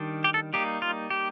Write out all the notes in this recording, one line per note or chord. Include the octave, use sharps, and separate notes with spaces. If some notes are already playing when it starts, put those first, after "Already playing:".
Already playing: D#3 G3 D4
G4
A4
G3 A#3 D#4 G4
F4
G4